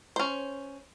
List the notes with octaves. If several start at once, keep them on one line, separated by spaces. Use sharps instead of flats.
C#4 C5